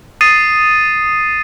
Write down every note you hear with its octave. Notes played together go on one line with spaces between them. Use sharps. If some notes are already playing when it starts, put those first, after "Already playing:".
D#6 A6 C7 D#7